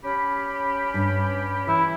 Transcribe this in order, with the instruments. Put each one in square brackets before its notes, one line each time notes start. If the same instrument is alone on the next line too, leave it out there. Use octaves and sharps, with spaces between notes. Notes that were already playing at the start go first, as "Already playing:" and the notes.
[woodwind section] C#4 G4 B5
[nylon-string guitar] G2
[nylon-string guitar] E3 [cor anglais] E4